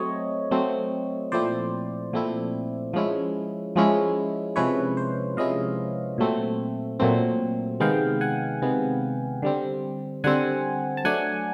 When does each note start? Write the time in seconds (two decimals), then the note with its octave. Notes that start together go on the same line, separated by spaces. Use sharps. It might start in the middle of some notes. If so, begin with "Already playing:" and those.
Already playing: F#3 A3 C4 C#5 D#5
0.51 F#3 A3 C4
1.32 A#2 F3 A3 C4 E4 C5 D5
2.13 A#2 F3 A3 C4 E4
2.93 F3 G#3 C#4 E4
3.76 F3 G#3 C#4 E4
4.56 C3 F3 G#3 C#4 E4 B4 C#5
4.97 C5
5.37 C3 F3 G#3 C#4 E4 D#5 F5
6.18 A#2 F#3 A3 C4
7.00 A#2 F#3 A3 C4
7.80 C3 D#3 G#3 B3 F5 G5
8.21 F#5 G#5
8.62 C3 D#3 G#3 B3
9.42 D3 G3 C4
10.24 D3 G3 C4 F#5 G#5
10.97 A5
11.05 F#3 A3 D4 F#5 G#5